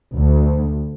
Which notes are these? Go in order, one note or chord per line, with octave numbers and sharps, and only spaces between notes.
D2